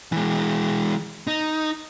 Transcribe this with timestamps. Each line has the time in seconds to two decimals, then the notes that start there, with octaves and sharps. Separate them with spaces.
0.12 E3 G#3
1.27 D#4